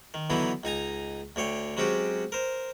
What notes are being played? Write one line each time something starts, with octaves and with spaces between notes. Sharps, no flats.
D#3
D3 E3 F#3 B3 D#4 E4
C#2 D#4 G#5 A#5
D2 D3 C#5 G5
F#3 G#3 C4 C#4 F#4 G4
A#4 C5